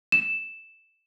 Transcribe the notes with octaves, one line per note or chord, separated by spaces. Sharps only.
E7